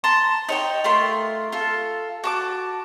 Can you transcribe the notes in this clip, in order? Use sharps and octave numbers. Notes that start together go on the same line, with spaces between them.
A5 A#5 C6
D#4 C#5 G5
A3 F4 A#4 C6
F4 A4
F#4 A5 D6